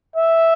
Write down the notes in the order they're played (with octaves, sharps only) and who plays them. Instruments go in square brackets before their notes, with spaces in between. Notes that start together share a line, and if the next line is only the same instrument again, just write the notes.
[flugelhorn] E5